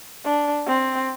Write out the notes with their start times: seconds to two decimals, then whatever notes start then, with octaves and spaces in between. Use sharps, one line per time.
0.25 D4
0.66 C4